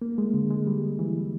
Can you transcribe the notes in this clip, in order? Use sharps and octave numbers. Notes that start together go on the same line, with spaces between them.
A#3
G#3
D3
G#3
G3
E3